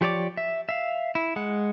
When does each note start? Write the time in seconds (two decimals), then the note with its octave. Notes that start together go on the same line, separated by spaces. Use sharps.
0.01 F3 G4 C#5 D5 D6
0.37 E5
0.69 E5 F5
1.15 E4
1.36 G#3 F#5